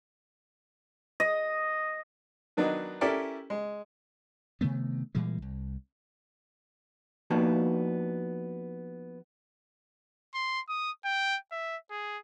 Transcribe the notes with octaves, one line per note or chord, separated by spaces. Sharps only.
D#5
D#3 F#3 B3 D4 D#4
C#4 E4 G4 A4 A#4 D5
G#3
C3 D#3 A3 B3
A#2 E3 G3 G#3
C2
F3 A#3 B3 D4 D#4 F#4
C6
D#6
G5
E5
G#4